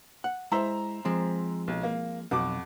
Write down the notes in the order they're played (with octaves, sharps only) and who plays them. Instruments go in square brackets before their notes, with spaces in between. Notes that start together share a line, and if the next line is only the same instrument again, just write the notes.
[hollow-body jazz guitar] F#5
[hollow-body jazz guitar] G#3 E4 C6 [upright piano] C5 E5 A#5
[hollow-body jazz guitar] F3 G#3 C4
[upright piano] B1
A#3
[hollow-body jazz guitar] B1 [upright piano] F2 F#4 D6